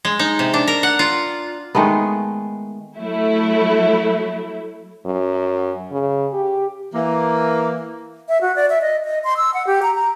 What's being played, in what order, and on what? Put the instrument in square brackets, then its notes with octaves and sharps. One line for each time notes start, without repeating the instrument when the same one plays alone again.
[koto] G#3
D#4
C3
D4
A#4
F#5
F4
[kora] D#3 G#3 A3 B3
[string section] F#3 A3 E4
[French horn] F#2
C#3
G4
[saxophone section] E3 A#3
[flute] E5
F#4
D5
E5
D#5
D#5
C6
E6
F#5
G4
A#5
A#5